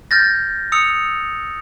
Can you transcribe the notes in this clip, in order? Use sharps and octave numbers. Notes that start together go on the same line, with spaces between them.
F6 G6 A6 A#6
D#6 E6 C#7 F7